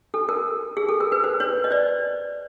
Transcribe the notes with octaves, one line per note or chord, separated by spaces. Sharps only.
A4
A#4
G#4
A4
A#4
B4
C5
B4 C#5
D#5
C5 D5